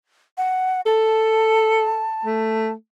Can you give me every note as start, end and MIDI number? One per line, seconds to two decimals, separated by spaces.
0.38 0.81 78
0.86 2.05 69
0.86 2.72 81
2.25 2.73 57